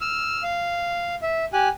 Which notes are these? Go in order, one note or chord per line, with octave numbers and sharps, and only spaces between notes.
E6 F6
F5
E5
G4 G#5 F#6